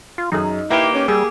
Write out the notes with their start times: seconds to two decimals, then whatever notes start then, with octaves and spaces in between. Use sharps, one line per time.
0.18 F4
0.32 F#2 D#4 G#4
0.70 A#3 E4 G4 B4 G5 A#5
0.95 C#4
1.08 G3 G#4 E6